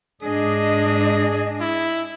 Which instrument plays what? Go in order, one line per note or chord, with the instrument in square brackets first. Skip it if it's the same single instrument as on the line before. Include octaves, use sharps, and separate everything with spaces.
[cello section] G#2 D4 D#5 [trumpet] G#4
[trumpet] E4